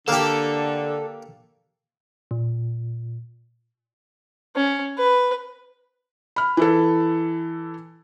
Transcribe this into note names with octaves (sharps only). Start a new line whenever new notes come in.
D3 A#3 G4 A4
A#2
C#4
B4
B5 F6
E3 E4 A4